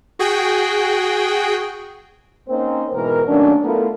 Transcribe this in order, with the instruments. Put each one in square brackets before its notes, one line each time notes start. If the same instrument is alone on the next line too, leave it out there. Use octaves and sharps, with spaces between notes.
[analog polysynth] F#4 G#4 G5
[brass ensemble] A#3 C4 C#4 D#4 C5
G#2 B2 E3 A#4
D#3 F#3 A3 A#3 C#4 D4
A3 B3 E4 F4 A4 A#4